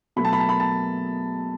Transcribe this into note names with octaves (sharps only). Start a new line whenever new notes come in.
B2 F#3 A3 B5
A5
B5
A5
B5
A5